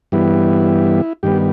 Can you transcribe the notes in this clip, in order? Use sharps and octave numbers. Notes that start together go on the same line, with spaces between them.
G2 E3 G3 B3 E4
G2 D#3 G3 B3 G4